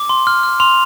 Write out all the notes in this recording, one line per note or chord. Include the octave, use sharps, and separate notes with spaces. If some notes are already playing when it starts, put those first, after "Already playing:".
Already playing: D6
C6
F6
F6
C6 F7